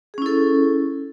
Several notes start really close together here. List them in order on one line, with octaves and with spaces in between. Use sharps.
G#4 C#4 E4 A4